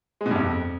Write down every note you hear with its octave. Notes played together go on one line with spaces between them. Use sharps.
G#3
B2
G2
F2